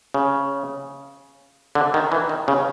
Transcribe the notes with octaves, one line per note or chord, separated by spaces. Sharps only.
C#3
D3
D#3
E3
D#3
C#3